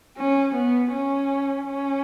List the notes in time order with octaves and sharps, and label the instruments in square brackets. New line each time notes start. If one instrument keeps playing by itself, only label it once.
[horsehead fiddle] C#4
B3
C#4
C#4